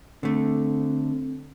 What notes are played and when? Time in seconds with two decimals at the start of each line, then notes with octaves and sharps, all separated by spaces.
0.23 D3 A3 C4